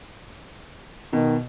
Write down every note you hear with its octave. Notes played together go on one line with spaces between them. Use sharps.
B2 D#3